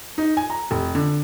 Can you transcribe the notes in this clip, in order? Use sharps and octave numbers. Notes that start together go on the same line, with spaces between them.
D#4
G#5
A#5
F1
D3